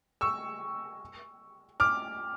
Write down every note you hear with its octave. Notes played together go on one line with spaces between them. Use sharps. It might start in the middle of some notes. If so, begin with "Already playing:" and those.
C#6 E6
D6 F6